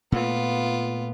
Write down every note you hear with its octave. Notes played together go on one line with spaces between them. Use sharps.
A#2 A3 B3 F4